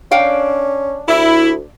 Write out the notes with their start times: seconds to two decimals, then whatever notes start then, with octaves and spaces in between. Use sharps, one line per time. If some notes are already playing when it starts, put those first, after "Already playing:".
0.11 C#4 D4 F5 G5
1.08 D2 E4